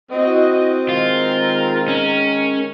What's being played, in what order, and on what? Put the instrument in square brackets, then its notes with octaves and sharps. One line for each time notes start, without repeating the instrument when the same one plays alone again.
[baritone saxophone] C4 [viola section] E4 F#4 D#5
[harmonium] D#3 G#3 [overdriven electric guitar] F4 [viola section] A#4
[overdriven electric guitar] C#4